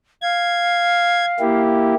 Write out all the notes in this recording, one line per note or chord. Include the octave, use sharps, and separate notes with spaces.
F5 G#6
A#3 E4 G4